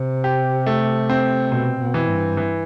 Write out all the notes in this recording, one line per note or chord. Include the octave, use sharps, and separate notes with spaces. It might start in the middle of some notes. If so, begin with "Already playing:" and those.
Already playing: C3
G4
A3
C4
B2 C4
B2
E3
G2
E3